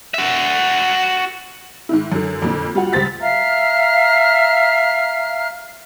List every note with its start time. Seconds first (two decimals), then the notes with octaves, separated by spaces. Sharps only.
0.14 F#4 E5
1.89 G#2 D#3 E4
2.12 F#2 D3
2.42 F2 A#2 D3
2.75 G3 F4 F#4 F#5
2.93 C#2 G3 C5 A6 B6
3.20 E5 F5 A#5 F6